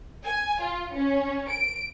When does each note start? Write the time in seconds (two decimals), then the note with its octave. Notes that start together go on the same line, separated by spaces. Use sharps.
0.24 G#5
0.61 F4
0.94 C#4
1.48 D7